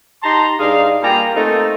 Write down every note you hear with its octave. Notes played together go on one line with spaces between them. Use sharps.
D#4 G4 A5 A#5 C6
G2 D#4 G#4 D5 F5
G3 A#3 F4 G5 G#5 A#5
A3 A#3 C4 D#4 F4 A4